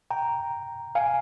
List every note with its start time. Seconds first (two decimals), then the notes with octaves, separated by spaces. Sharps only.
0.11 G5 A#5
0.95 F5 G#5